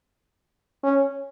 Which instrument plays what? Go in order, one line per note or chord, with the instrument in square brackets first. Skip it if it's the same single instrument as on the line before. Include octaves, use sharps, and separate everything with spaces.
[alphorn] C#4